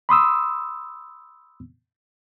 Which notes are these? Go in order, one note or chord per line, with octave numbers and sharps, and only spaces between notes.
B5 C6 D#6 E6